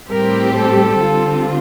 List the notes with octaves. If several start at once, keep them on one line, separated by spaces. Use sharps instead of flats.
A2 G3 C4 G4 A#4 C5
A4
D3 G3 C4 F4